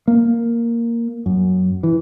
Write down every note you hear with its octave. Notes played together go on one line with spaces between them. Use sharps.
A#3
F#2
E3